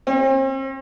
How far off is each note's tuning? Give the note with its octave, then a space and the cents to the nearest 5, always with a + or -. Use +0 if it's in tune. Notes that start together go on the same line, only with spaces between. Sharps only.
C4 +40